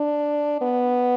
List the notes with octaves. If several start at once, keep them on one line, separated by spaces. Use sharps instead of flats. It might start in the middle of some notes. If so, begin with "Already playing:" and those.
Already playing: D4
B3